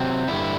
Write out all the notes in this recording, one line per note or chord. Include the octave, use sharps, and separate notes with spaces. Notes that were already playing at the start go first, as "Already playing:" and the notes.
Already playing: C3 F#3 C4
G2 D3 G3 E4